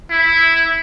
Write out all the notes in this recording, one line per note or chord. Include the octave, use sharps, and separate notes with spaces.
E4